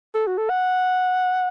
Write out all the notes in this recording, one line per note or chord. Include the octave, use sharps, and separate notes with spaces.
A4
F#4
A4
F#5